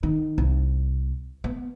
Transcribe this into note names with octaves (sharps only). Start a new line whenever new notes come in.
D#3
C2
B3